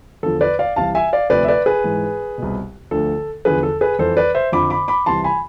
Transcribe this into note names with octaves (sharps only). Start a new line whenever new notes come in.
E2 D3 F3 A4
B4 D5
D5 F5
C2 C3 E3 F5 A5
E5 G#5
D5 F5
D2 C3 F3 B4 D5
E5
B4 D5
G#4 B4
G#2 E3
C2 B2
D2 D3 F3 A4
E2 D3 F3 G#4 B4
A4
G#4 B4
F2 E3 A4 C5
B4 D5
C5 E5
F2 D3 F3 B5 D6
B5 D6
B5 D6
C2 C3 E3 A5 C6
G#5 B5